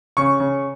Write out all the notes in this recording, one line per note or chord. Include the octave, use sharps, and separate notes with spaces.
C#3 C#6
C#3